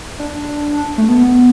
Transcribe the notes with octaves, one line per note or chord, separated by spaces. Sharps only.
D4
A3
B3